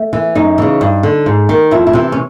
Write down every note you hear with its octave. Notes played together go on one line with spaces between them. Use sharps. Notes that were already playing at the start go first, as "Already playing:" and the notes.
Already playing: A3
E3
F#2 D#4
C#3 E3
G2
D3
G#2
D#3
F2 E4
E4
C3 E3
C#4